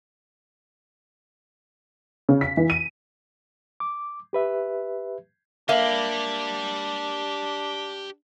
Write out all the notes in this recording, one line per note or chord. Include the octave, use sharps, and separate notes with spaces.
C#3
B6
E3
D#7
D6
G4 B4 E5
A#3 D4 G4 E5 B5